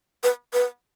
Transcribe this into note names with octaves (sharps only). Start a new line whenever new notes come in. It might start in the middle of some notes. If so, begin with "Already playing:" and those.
B4
B4